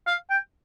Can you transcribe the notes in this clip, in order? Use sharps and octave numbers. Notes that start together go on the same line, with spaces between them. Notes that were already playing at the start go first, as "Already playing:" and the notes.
F5
G5